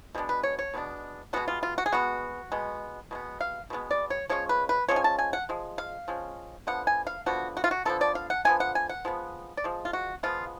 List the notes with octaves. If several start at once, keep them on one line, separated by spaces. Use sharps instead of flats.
B2 G#3 B3 D4
B4
C#5
C#5
B2 G#3 B3 D4
B2 G#3 B3 D4 F#4
F4
F4
F#4
G#4
B2 G#3 B3 F#4
B2 G#3 B3
B2 G#3 B3
F5
B2 G#3 B3
D5
C#5
F3 G#3 C#4 C#5
B4
B4
F3 G#3 C#4 C#5
G#5
A5
G#5
F#5
F3 G#3
F5
F3 G#3 C#4
D3 F3 B3 F#5
G#5
F5
D3 F3 B3 F#4
F#4
F4
F#4
D3 F3 B3 A4
D5
F5
F#5
D3 F3 B3 G#5
F#5
G#5
F#5
F3 G#3 B3
D5
F3 G#3
F4
F#4
F3 G#3 B3 F4